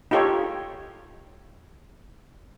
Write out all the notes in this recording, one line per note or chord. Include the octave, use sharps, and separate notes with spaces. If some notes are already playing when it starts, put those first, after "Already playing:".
D#4 F4 G4 A4 C#5